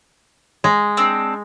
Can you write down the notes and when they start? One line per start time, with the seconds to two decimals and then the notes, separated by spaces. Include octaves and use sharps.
0.64 G#3
0.97 C4 D4